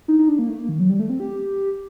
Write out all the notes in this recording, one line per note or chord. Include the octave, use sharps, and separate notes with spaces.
D#4
D#4
D4
A#3
A3
A#3
D#3
F#3
G3
A3
C4
G4